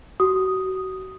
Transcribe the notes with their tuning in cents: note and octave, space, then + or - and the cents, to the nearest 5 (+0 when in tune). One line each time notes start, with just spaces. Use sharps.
F#4 +30 D#6 +0